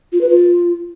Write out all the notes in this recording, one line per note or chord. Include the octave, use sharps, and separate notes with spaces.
F4
B4
F4